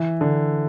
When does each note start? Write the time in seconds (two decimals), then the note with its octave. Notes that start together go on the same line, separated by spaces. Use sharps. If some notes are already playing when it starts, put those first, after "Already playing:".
Already playing: E3
0.21 D3